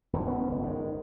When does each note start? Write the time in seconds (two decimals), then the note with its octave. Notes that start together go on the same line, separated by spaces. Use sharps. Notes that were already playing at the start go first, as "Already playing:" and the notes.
0.13 D#1 F#2 D3
0.27 B3 C#4
0.48 G1 C#2
0.63 G#2 D#3